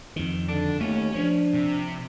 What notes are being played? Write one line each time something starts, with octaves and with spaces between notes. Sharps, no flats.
F2 D#3
D3 D4
D#2 A3 C#4
F3 D4
C3